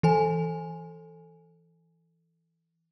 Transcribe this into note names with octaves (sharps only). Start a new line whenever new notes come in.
E3 A4 G#5